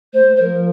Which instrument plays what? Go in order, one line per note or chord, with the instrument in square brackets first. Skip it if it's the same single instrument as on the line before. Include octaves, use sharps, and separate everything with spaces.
[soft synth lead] A3 [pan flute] C5
[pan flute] C5
[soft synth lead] F3 [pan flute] A#4